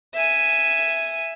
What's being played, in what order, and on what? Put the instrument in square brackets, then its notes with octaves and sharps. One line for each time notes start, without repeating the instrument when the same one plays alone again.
[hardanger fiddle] E5 G#5